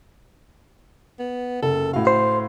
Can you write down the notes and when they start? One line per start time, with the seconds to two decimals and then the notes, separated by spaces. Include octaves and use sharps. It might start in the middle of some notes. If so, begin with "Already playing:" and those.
1.19 B3
1.63 F#1 A4
1.93 A2 F#4 F5
2.07 C5